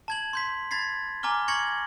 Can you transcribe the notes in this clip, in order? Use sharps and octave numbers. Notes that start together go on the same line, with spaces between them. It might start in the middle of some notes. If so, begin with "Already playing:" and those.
A5 G#6 F#7
C6 G6 B6
B5 G#6 A6 B6 C7
G#5 A#5 D6 F6 G7
C#6 G#6 A#6 C#7 F#7